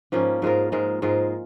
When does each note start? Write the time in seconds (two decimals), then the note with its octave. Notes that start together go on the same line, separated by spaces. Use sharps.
0.12 G#2 F3 A#3 C#4
0.42 G#2 G#3 F4 A#4
0.72 G#2 G#3 F4 A#4
1.02 G#2 G#3 F4 A#4